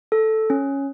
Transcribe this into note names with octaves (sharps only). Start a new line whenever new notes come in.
A4
C#4